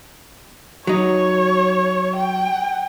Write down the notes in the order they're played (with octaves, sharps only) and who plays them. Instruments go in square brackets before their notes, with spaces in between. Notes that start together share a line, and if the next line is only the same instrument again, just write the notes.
[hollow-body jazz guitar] F#3 D#4 [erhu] C#5
[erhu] G5